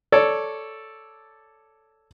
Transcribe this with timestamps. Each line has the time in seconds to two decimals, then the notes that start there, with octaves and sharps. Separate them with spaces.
0.12 A4 C#5 D5